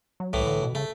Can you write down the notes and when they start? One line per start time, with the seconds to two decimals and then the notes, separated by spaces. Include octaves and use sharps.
0.20 F#3
0.33 C2 A2 E3
0.47 D3
0.63 B2
0.75 C#3 A3